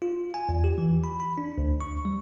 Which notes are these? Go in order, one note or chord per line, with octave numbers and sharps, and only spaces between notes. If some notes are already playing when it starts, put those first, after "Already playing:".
F4
G#5
E2
G4
E3
B5
B5
D4
D2
C#6
G3